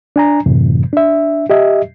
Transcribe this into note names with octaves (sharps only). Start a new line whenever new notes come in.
D4 G#5 A#5
F#2 A2 C3 E3
D4 E5
G4 D#5 E5